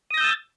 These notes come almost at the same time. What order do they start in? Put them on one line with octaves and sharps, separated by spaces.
D#6 A#6 G6 E6 A6